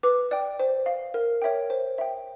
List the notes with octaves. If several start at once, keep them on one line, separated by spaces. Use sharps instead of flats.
B4 D6
D5 G5
C5
F5
A#4
C#5 E5 G5
C5
E5 G5